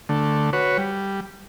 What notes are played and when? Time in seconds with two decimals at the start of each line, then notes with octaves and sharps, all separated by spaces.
0.09 D3 A3
0.53 F#4 B4 C#5
0.78 G3